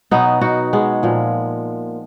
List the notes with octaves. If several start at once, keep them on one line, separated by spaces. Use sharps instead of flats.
B2 F#3 B3 D#4
D#4 F#4
G#3 B3
A#2 F3